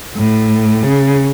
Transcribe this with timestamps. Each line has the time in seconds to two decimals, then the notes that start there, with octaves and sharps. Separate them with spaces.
0.16 A2
0.83 C#3